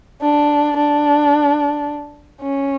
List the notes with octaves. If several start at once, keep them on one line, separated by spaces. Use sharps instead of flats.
D4
D4
C#4